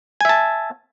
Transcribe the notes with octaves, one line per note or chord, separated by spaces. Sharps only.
E5 G#5 A5